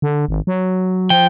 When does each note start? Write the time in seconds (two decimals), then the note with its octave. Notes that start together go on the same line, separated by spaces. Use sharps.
0.02 D3
0.28 G#1
0.47 F#3
1.10 F3 G5